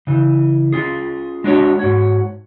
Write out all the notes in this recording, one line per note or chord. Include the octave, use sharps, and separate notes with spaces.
C#3 E3
C#4 F4 G#4
G#3 D4 F#4 C#5
G#2 F#4 C#5